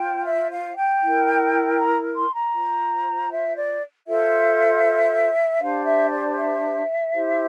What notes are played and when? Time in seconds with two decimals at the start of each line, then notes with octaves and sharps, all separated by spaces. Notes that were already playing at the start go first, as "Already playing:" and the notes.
Already playing: F4 C5 G5
0.25 E5
0.50 F5
0.76 G5
1.01 E4 A#4
1.77 A#5
2.15 C6
2.34 A#5
2.54 F4 C5
3.30 E5
3.55 D5
4.06 F4 A4 C5 E5
5.59 D4 G4 C5 F5
5.85 E5
6.11 D5
6.36 E5
7.12 E4 G4 C5